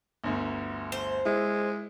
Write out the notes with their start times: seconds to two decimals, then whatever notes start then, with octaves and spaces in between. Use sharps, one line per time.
0.24 G1 D2
0.92 C5
1.25 G#3 E4